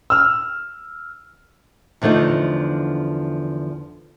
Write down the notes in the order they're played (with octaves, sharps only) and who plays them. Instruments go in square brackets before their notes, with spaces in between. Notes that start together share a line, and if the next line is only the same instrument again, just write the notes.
[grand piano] E6 F6
[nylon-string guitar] E2 D3 F3 A3 D#4